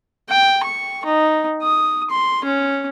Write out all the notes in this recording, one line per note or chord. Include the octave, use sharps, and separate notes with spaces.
G5
C#6
D#4
D#6
C6
C#4